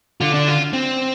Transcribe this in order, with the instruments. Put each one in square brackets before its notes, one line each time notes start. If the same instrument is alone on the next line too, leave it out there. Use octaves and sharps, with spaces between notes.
[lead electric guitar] D3 [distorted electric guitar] F4
[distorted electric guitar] D4
F4
C4